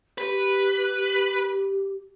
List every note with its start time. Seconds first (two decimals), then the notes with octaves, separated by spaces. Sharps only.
0.18 G4 B4